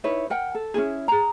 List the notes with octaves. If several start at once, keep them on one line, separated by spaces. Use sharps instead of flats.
D#4 E4 B4 C#5
A#4 F#5 G5
A4
C#4 D#4 E4 G#4
G#4 A#5